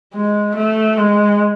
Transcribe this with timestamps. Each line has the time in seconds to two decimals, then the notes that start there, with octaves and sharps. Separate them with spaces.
0.14 G#3
0.55 A3
0.97 G#3